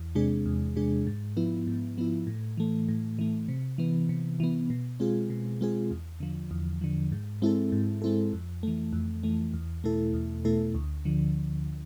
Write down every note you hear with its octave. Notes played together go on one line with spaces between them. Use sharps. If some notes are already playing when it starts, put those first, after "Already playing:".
Already playing: E2
C3 G#3 D4 G#4
E2
C3 G#3 D4 G#4
G#2
F3 B3 E4
G#2
F3 B3 E4
A2
E3 A3
A2
E3 A3
C3
E3 B3
C3
E3 B3
B2
G#3 C4 F4 G#4
B2
G#3 C4 F4 G#4
E2
D3 F3
E2
D3 F3
G#2
G#3 C4 E4 A4
G#2
G#3 C4 E4 A4
F2
E3 A3
F2
E3 A3
E2
B2 A3 E4 A4
E2
B2 A3 E4 A4
D2
D3 F3